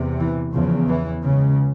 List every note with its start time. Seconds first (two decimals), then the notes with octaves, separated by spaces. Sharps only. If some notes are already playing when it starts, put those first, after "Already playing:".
Already playing: E2 C3
0.20 E3
0.54 E2 C#3 F3
0.88 E3
1.22 C#2 C#3